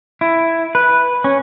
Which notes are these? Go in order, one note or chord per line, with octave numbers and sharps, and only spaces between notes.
E4
B4
C#4